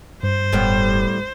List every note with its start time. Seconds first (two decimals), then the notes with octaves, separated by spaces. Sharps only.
0.23 G2 C5
0.52 F1 A2 G3 B3